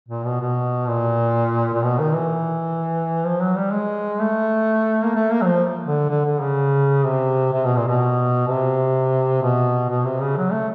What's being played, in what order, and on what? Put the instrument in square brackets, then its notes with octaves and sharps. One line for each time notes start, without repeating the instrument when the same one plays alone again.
[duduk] A#2
B2
B2
A#2
A#2
B2
D#3
E3
F3
F#3
G3
G#3
A3
A#3
A3
A#3
F#3
F3
D3
D3
D3
C#3
C3
C3
B2
A#2
B2
C3
B2
B2
C3
C#3
F#3
A3